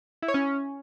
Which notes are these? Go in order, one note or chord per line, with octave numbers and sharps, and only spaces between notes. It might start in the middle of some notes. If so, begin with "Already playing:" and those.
E4
C#5
C#4